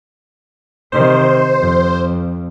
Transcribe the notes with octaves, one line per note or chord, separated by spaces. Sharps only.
C3 D#3 C5
F2